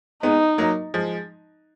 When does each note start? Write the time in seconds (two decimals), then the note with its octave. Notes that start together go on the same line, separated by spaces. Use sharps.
0.23 G#3 B3 D#4
0.58 F#3 A#3
0.94 F3 G#3